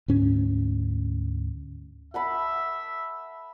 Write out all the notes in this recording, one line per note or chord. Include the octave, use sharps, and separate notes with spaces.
D2 G#2 C#4
E5 F#5 A5 B5